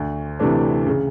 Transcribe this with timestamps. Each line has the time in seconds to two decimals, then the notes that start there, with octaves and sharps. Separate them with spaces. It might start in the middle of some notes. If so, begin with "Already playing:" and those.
Already playing: D2
0.40 C3 E3 A3 D4
0.87 C#3